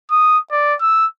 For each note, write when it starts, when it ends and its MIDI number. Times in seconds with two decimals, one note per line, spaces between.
0.11 0.38 87
0.51 0.75 74
0.81 1.06 88